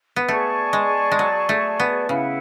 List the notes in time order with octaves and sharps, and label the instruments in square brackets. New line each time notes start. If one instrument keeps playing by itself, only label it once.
[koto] B3
[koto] A3 [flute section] G#4 D5 A5 C#6
[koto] G#3
G#3
F#3
A3
B3
[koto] C#3 [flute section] E4 B4 F#5